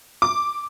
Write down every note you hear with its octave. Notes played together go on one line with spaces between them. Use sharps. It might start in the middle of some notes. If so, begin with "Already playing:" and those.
D6